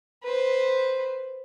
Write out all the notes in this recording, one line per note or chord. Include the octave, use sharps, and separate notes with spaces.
B4 C5